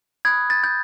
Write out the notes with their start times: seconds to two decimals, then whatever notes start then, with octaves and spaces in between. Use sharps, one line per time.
0.25 B5 D#6 F#6 G#6
0.50 A6
0.64 G6